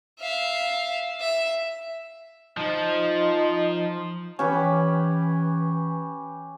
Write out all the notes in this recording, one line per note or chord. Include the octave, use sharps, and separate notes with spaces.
E5 F5
E5
F3 D#4
E3 C#4 G4 B4